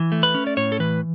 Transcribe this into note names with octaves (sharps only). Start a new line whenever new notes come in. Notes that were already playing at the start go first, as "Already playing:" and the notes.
Already playing: E3
A3
B4
C#4
D5
A2 C#5
A4
E3 B4